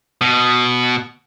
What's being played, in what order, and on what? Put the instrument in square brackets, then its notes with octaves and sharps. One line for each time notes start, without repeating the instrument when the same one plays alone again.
[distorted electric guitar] B2